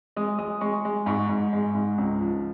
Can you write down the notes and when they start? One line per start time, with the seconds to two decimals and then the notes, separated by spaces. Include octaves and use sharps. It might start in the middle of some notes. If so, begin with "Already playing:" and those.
0.16 G#3 D#6
0.38 G#3 D#6
0.61 G#3 C#6
0.85 G#3
1.06 G#2 C#6
1.29 G#2
1.53 G#3
1.74 G#2
1.98 C#2
2.21 F3